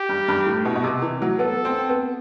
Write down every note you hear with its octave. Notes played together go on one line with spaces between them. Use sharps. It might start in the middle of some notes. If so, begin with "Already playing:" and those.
Already playing: G4
G2
G2
A2
B2
B2
C3
E3
F#3
B3 A4
C4
B3